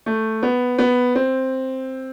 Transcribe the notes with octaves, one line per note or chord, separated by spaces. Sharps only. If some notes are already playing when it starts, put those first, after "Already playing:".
A3
B3
B3
C4